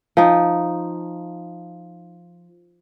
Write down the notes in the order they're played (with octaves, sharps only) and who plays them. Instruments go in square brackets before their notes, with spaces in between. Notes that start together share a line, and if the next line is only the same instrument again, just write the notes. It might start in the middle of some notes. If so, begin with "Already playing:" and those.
[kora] F3 D#4